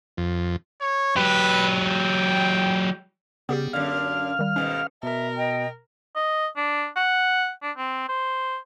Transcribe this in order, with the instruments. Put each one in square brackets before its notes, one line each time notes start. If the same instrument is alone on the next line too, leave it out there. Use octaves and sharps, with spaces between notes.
[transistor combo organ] F2
[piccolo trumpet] C#5
[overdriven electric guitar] F#3 G4 [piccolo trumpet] B4
[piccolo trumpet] G5
[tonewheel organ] C#3 [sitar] G3 [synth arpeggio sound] B3 G4 G#4
[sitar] F#2 D3 [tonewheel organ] F5 F6
[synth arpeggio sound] D#3 G3
[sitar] G#2 B2 D#3 [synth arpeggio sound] C#4
[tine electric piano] B2 [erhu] A#4 [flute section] E5
[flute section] D#5 G5
[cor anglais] D#5
D4
F#5
D4
C4
C5